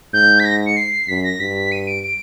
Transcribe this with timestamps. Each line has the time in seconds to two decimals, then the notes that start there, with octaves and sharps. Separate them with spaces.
0.13 G#2 G6
0.40 B6
0.45 A#6
0.66 C#7
0.77 C7
1.08 F#2 B6
1.24 A#6
1.40 G2 B6
1.72 D#7
1.87 D7
2.04 D7